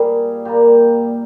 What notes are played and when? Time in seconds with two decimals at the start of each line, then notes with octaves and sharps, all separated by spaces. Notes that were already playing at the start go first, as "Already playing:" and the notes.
Already playing: A#2 G3 A#3 G#4
0.45 A#2 G3 A#3 G4